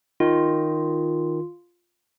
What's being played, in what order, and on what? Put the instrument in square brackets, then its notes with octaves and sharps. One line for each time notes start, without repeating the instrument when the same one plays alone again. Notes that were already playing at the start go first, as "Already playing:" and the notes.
[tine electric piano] D#3 [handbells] F4